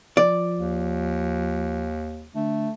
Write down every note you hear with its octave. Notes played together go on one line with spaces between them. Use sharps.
F3 D5
D#2
D3 A3